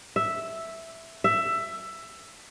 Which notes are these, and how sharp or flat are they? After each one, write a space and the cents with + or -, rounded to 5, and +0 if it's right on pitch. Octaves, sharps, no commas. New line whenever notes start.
E5 +0
E5 +15